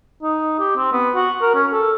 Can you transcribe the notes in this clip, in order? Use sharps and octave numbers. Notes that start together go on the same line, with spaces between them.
D#4
G4
C4
B3
F#4
A#4
C#4
A4